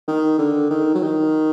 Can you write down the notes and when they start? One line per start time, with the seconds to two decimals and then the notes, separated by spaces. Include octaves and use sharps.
0.07 D#3
0.39 D3
0.70 D#3
0.95 F#3
1.02 D#3